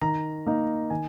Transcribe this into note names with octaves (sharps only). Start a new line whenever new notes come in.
D#3 A#5
A#3 D#4
D#3 G#5